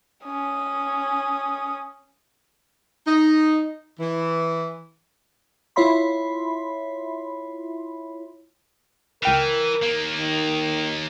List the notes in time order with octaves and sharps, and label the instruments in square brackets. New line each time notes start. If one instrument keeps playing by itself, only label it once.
[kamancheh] C#4 D#6
[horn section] D#4
E3
[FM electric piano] E4 F4 C#5 E5 B5 C6
[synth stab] C#2 G5 F6 [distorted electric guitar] E3 [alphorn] A#4
[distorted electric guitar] D#2 A#3
[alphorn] D#3